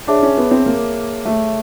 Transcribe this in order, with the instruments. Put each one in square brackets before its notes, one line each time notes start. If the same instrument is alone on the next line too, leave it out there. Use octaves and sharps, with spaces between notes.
[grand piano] D4 [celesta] G#4 C#5 E5 A5 D6
[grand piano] C#4
B3
C4
A#3
A3